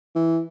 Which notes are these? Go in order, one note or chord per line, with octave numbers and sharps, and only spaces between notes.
E3